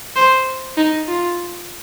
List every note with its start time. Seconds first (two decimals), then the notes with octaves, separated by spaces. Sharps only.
0.16 C5
0.77 D#4
1.08 F4